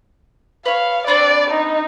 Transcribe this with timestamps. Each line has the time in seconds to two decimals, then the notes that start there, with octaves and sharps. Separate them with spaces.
0.66 B4 C#5 F5
1.07 C4 D4 B4 D5
1.51 D#4